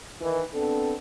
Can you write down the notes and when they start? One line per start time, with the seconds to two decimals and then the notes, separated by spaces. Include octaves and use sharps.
0.21 D#3 E3 E4
0.54 B3 C4 D4 A4